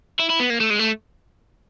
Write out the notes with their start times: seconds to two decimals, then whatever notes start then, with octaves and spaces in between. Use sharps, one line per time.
0.19 E4
0.30 E4
0.39 B3
0.50 A#3
0.60 A3
0.70 G#3
0.79 A3